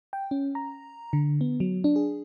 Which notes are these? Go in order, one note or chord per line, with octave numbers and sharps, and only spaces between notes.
G5
C#4
A#5
D3
B3
F#3
D4
G#4